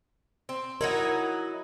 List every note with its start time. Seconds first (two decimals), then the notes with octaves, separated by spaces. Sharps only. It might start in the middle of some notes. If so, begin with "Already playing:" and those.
0.49 C4
0.81 F#3 D#4 E4 A#4